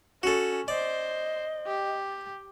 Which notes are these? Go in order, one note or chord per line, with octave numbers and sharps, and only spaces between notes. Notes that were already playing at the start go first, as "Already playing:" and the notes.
C#4 F#4 A4
C5 D5 D#5
G4